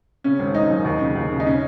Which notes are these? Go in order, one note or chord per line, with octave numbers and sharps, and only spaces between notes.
C#3 C#4
G#1
G#1 D#4
F#2
D#2
C#3
D#2
C#3
D#4
C#3 C#4